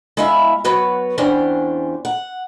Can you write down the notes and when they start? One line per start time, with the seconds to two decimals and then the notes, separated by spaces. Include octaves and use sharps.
0.17 G#3 B3 E4 E5 F5
0.64 F#3 B3 F#4 B4 C#5
1.18 E2 C#4 D4 G4 C5
2.05 F#5